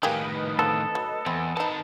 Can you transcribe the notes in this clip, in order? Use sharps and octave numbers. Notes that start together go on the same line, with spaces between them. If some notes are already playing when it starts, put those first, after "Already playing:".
A2 D#3 A#3 G4 G#4 B4 D#5
D3 A#3 C4 A4
F#3
E2 C4
D#3 B3 D#4 A5